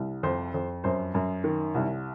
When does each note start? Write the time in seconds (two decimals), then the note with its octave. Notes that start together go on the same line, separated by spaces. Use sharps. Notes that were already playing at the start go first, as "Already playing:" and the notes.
Already playing: C2
0.23 F2 C5
0.54 F2
0.84 F#2 C5
1.14 F#2
1.44 D#3
1.75 C2